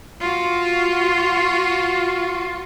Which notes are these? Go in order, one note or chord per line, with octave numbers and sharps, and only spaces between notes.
F4 F#4